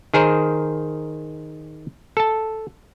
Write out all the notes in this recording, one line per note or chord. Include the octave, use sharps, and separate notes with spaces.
D#3 G#4 A#4 C5
A4 A5